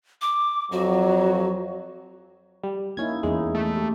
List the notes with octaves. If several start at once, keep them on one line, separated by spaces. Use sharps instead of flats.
D6
F2 F#3 F#4
G3
A#3 C#4 D#4 E4 G#6
E2 G#3 C#4 D#4 E4
A3
G4